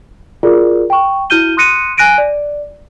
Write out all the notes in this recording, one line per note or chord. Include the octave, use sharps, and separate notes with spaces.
F4 F#4 G#4 A#4 D5
G5 C#6
E4 F#4 F6 G6 D#7 G7
C6 D#6 F#6 A#6 C#7 D#7
G#5 F#6 A#6 D7 D#7
D5